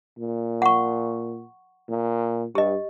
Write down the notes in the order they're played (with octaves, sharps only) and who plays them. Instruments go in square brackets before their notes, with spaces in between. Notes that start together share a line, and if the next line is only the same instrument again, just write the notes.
[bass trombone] A#2
[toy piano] F#5 C#6
[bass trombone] A#2
[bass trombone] G2 [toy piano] G4 D#5